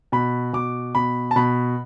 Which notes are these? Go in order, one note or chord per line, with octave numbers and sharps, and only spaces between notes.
B2 B5
B2 D6
B2 B5
A5
B2 B5